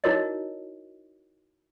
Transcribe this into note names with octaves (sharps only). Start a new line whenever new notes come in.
D#4 E4 F#4 A#4 C#5 D#5